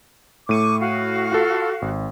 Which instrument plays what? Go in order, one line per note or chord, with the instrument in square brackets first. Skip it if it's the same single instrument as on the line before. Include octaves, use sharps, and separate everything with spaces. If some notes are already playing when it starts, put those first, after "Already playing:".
[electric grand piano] A2 A3 D#7 [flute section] C#6 D6
[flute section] F#4 F5
[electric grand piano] F4 A4
G#1